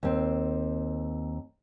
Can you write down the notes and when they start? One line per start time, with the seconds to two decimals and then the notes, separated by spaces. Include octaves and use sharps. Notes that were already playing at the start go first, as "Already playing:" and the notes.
0.03 D#2 C4